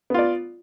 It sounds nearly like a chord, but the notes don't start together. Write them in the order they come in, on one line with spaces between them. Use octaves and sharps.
B3 F4 D5